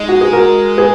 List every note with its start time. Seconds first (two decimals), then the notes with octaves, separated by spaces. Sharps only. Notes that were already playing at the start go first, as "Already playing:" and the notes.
Already playing: G#3 D#4
0.09 F#4
0.21 G#4
0.33 F#4 A#4
0.77 G#4 B4